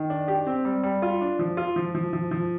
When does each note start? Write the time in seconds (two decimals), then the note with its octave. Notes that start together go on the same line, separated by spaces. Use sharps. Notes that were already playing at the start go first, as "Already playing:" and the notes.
Already playing: D#3
0.10 D4
0.28 G4
0.47 C4
0.65 G3
0.83 G3
1.02 F4
1.21 D4
1.39 F3
1.57 F4
1.76 F3
1.95 F3
2.13 F3
2.31 F3